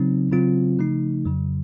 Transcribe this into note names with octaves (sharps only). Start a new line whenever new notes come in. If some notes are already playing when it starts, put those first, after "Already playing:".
Already playing: C#3 F#3 C4 D#4
C#3 F#3 C4 F4
C#3 F3 A3 D#4
F2 C#3 F#3